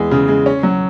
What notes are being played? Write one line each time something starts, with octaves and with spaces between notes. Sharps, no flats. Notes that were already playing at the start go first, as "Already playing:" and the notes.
Already playing: E2 G#3
C#3
G#3
C#4
F#3